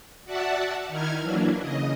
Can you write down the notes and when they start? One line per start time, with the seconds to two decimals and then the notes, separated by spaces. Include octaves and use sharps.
0.25 F#4 D5 E5 F#5 A5
0.88 D#3 D#4 E4 F6 G#6
1.21 E3 F#3 A#3 D4 E4
1.60 C#3 D#5